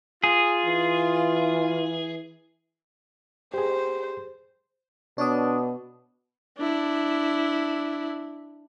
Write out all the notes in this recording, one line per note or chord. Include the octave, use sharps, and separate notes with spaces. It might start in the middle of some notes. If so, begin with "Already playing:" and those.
F4 G#4
E3
G4 G#4 C5
B2 D4 C#5 D5 D#6
D4 E4